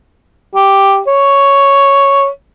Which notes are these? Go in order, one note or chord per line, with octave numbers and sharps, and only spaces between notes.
G4
C#5